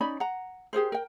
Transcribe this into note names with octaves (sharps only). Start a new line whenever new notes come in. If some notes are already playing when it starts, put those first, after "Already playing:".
C#4 D#4 D5 B5
F#5 A#5
G4 G#4 A#4 C5
A#4 G5